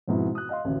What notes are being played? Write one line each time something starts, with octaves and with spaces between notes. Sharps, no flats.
F2 G#2 B2 E4
D#6 F#6
D#5 F5 C6
A1 D2